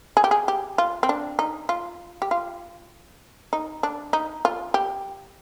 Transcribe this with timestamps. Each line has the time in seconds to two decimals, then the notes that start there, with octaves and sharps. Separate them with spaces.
0.17 G#4
0.24 G4
0.31 G#4
0.48 G4
0.78 F4
1.03 C4
1.09 D4
1.39 D#4
1.69 F4
2.22 G4
2.31 F4
3.53 D#4
3.83 D4
4.13 D#4
4.45 F4
4.74 G4